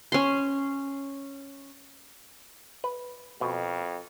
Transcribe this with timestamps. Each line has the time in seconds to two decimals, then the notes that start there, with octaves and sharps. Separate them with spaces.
0.12 C#4 C6
2.84 B4
3.41 F2 B2